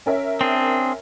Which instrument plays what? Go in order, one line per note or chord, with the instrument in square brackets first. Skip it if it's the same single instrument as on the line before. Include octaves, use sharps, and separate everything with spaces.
[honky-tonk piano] C#4 A#4 E5
[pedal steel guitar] C4 D4 G#4